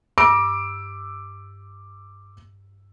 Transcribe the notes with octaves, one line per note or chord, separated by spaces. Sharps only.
G2 D6 E6 D7